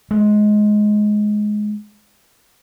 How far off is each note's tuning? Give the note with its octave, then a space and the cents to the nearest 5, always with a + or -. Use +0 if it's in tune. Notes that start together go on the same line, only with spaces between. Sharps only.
G#3 +15